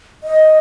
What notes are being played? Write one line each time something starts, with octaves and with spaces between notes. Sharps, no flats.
D#5